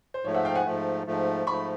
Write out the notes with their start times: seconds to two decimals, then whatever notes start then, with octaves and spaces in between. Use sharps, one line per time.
0.14 C5
0.24 G#2 F3 A3 C#5
0.34 E5 F#5
0.45 F5 G5
0.55 F#5 G#5
0.65 G#2 F3 A3
1.06 G#2 F3 A3
1.47 G#2 F3 A3 B5 C#6